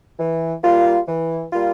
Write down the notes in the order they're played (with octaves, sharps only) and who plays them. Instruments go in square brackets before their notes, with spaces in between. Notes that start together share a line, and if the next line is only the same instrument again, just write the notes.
[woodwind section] E3
G3 A#3 F4
E3
G3 A#3 F4